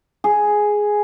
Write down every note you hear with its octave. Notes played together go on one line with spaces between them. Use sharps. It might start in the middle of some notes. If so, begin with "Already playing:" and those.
G#4